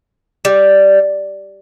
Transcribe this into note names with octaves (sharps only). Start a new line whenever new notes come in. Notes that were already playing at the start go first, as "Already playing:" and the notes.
G3